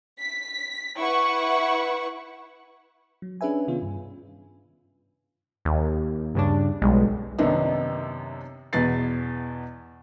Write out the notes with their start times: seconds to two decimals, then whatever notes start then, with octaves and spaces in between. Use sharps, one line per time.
0.19 B6
0.97 E4 B4 F#5 C#6
3.22 F#3
3.41 C#4 D4 G#4 B4 E5 G#5
3.68 C3 D#3 B3 C#4 F4
3.82 G2
5.65 D#2
6.35 G2 C#3 D4
6.82 B1 G3 G#3
7.38 F#2 C3 D#3 B3 D4 D#4
8.73 E2 B2 B3 B4 A6 C7